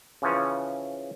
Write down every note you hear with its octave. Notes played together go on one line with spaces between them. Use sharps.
C#3 E3 F3 C#4